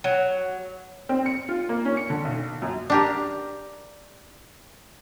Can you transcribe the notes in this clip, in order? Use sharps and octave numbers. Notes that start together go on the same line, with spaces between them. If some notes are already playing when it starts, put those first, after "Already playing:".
F#3
C4
C#7
F4
A#3
C#4
C#7
D3
B1
F#2
D4 G4 A#4